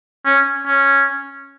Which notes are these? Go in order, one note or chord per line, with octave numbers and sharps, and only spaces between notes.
C#4
C#4